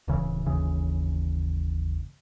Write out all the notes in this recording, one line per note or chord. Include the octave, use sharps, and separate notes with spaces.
D1 C#3 E3
G1 D#2 C#3 E3